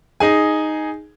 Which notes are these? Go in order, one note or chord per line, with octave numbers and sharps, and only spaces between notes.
D#4 G#4 G#5